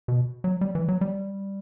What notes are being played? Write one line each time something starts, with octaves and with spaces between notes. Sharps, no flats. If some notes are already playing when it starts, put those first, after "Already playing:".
B2
F#3
G3
E3
F#3
G3